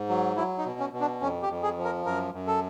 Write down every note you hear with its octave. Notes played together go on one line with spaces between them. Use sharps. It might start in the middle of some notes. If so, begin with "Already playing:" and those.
Already playing: G#2
F#3
F#3 E4
D#4
B2
C#4
B2
D4
F2 C#4
G4
F2
G#4
F3
A#4
F#2 A#4
F#2
A4